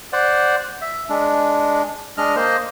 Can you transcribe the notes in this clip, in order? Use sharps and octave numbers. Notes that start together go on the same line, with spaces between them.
C5 D5 F#5
E5
G#3 D4
G#3 D4 D#5 F6
A#3 C5 D#5